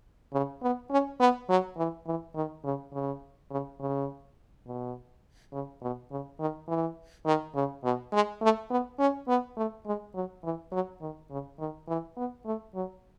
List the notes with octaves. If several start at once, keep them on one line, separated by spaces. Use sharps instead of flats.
C#3
B3
C#4
B3
F#3
E3
E3
D#3
C#3
C#3
C#3
C#3
B2
C#3
B2
C#3
D#3
E3
D#3
C#3
B2
G#3
A3
B3
C#4
B3
A3
G#3
F#3
E3
F#3
D#3
C#3
D#3
E3
B3
A3
F#3